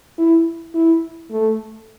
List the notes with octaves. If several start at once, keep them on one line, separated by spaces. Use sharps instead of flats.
E4
E4
A3